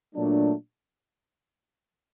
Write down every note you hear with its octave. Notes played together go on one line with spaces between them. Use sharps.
A#2 F#3 A3 D4